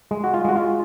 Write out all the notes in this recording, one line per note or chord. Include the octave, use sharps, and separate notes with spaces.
G#3
F#4
F4
G#3 F#4
F4